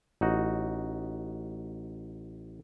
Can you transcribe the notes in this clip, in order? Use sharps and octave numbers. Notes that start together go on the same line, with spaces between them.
A1 D#4 F#4